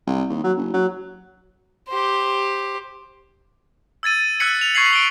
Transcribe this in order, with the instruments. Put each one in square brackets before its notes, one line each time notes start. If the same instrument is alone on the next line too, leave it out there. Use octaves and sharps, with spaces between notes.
[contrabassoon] C2
D#2
F#3
F#1
F#3
[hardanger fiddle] G4 C5
[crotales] E6 G#6 A6 D#7
E6 F#6 G#6 B6 C#7 F#7
F7
C#6 G#6 B6 C7 F#7
C#7 D7 G7